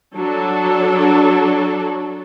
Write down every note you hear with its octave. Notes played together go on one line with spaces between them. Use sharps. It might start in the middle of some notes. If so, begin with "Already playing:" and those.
F#3 D4 A4